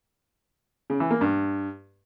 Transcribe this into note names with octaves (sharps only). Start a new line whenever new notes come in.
C#3
E3
A#3
G2